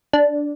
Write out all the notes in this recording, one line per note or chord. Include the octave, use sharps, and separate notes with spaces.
D4